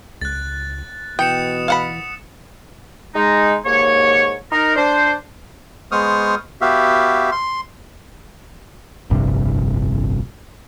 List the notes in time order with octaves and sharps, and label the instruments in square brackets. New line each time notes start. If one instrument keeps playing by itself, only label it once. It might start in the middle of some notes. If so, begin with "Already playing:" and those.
[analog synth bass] C#2 [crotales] F#6 A6
[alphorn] B2 [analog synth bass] E3 [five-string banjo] G5 [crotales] D#6 C#7 E7
[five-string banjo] F5 F#5 B5
[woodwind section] G#3 D#4
D#2 G#2 A#3 C#5
D#4 A#4
D4 C5
[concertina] G#3 B3 C5 C#6 D#6 F6
B3 F#4 G4 E5 F5
C6
[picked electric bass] F1 A#1 G2 C3